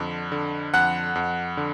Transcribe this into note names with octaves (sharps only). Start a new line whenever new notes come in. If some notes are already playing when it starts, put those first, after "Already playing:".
Already playing: F2 D3
D3
F2 F#5 F#6
F2
D3